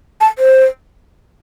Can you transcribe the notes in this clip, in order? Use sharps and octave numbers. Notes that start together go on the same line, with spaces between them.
A5
C5